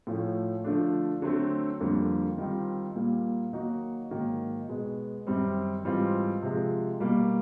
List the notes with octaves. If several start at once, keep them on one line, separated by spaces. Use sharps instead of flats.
A2 F3 A3 C#4
D3 F3 A3 D4
D3 F#3 A3 C4
F2 D3 G3 A#3
D#3 G3 C4 F4
A#2 G3 A#3
D#3 F#3 A#3 D#4 F#4
G#2 D#3 F#3 A#3 C#4
B2 G#3 B3
F#2 D#3 G3 C4
G#2 E3 G3 C4 F4
C3 F3 G#3
B2 G3 A#3